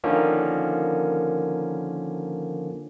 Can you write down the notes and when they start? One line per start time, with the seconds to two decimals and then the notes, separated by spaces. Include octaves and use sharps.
0.04 D3 D#3 F3 A#3 C#4